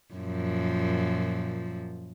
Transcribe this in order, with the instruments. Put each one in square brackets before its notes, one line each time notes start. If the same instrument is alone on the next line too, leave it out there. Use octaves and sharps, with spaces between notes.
[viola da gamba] F#2 A#2 F3